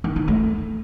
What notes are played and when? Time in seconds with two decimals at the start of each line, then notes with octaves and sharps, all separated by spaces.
0.04 D#3
0.16 E4
0.28 A3